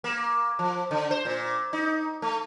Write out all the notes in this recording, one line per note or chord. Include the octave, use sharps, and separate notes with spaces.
A#3
F3
D3
C5
A#2
D#4
A3